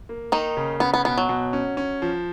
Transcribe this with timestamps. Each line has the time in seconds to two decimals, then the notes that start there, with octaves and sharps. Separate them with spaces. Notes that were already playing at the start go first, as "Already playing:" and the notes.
0.09 A#3
0.32 D#3 A#3 D#4
0.57 C#3
0.80 B3 C#4
0.94 B3
1.05 B2 B3
1.18 F#3
1.29 B2
1.53 C#4
1.77 C#4
2.02 F3